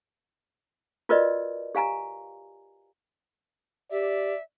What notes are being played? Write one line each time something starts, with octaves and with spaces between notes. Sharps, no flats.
F4 F#4 A#4 B4 D5 D#5
G4 F5 G#5 A#5
G4 D5 E5